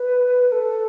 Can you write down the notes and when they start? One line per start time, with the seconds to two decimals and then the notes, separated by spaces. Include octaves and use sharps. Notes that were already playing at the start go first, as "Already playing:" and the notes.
Already playing: B4
0.52 A4